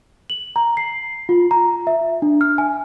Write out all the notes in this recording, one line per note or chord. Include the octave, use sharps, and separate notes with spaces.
F#7
A#5
C7
F4
A#5
E5
D4
F6
G#5